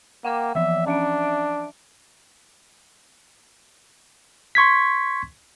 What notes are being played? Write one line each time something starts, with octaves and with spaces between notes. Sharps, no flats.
A#3 F#5 G5 D6
E3 F3 E5
C#4 D4 E5 D7
C6 C#6 G#6 B6